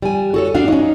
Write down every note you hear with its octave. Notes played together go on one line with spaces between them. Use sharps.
G3 G#5
F#4 A4 C#5
D4 F#4 D5 F5
C#4 D#4